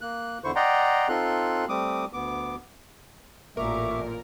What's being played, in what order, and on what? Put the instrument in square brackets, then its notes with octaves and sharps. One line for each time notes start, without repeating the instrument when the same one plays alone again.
[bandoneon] A#3 F#6
E2 D3 E4 C5 C#6
D5 D#5 F#5 G5 A#5 C6
C4 D#4 F4 A4 C6 F#6
G3 A3 C4 D6 D#6
D2 B3 D6
[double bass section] A1 [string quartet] A#2 [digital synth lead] A#4 [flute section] E5 C#6 D6